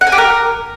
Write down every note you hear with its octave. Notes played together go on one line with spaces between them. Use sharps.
F#5
G#5
G4
A#4